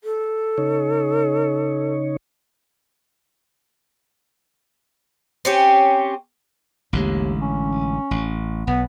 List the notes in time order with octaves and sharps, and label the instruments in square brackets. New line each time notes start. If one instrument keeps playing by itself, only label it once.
[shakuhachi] A4
[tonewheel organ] C#3 D#4 C#5
[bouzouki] C4 C#4 G4
[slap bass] A1 D3 G#3 [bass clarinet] D#2
[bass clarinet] C#4
[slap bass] A1
[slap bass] B1 [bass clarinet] B3